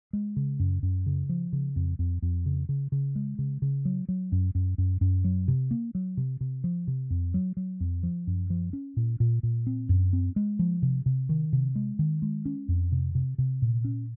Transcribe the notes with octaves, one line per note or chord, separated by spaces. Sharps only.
G#3
C#3
F#2
F#2
C#3
F3
C#3
F2
F2
F2
C#3
C#3
C#3
G#3
C#3
C#3
F#3
F#3
F#2
F#2
F#2
F#2
F#3
C3
A#3
F#3
C3
C3
F3
C3
F2
F#3
F#3
F2
F3
F#2
F3
C#4
A#2
A#2
A#2
C4
F#2
C4
G#3
F3
C3
C3
D#3
C3
G#3
D#3
G#3
C#4
F2
C3
C3
C3
A#2
C#4